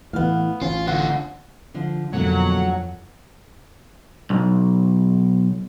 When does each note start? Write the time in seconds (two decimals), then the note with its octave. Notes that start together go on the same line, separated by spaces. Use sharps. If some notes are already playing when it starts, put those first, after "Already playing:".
0.13 A2 E3 B3 F5
0.61 A1 C#4 F4
0.87 D3 F4 F#5
1.74 D3 F3
2.13 F2 B2 D3 F#3 A#3 C#5 F#5
4.30 B1